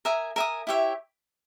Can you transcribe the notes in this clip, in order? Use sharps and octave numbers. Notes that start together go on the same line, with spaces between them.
A#4 E5 G#5 D#6
A#4 E5 G#5 D#6
E4 G4 C#5 E5